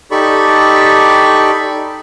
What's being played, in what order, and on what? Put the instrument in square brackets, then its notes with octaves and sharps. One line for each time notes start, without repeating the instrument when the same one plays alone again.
[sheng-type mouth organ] D#4 G4 A4 D5 B5 C#6